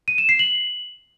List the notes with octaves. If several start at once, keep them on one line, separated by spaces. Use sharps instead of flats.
D#7
E7
C7
F#7